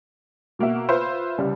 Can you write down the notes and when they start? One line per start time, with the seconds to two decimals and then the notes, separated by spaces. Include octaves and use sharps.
0.59 B2 A#3 F#4 E5
0.88 F4 B4 C5 E5
1.38 C2 C#3 G3